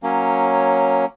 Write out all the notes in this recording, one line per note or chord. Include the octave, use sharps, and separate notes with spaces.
F#3 A#3 C#4